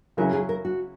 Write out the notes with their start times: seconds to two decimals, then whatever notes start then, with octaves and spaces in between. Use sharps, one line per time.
0.17 C#3 F#3 C#4 E4 A#4
0.33 G#4
0.49 A#4
0.65 F#4